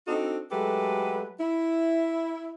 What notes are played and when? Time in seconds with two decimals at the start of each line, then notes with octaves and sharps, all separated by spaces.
0.08 C4 D4 D#4 F#4 A4
0.52 F#3 G#3 A3 G4 A4 B4
1.40 E4